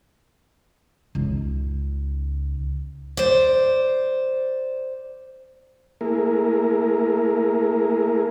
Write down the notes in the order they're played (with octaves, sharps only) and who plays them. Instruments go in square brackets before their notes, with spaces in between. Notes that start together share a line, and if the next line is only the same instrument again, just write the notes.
[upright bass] C#2 D#4
[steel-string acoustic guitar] C5 D5
[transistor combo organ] A3 A#3 E4 G#4 A#4